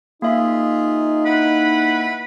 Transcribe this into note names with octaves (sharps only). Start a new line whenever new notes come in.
A#3 D#4 F4 G#4 E5
E4 B4 F#5 B5